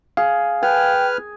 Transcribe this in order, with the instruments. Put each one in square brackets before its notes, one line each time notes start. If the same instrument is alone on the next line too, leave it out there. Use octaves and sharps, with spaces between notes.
[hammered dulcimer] G#4 [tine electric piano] F5
[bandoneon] B4 F6 [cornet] G5 [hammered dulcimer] G#5